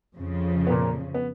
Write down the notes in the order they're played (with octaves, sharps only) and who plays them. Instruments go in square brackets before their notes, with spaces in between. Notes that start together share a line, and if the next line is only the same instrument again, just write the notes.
[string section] F2 C#3 F3
[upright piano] B3
A#2 A#3
B3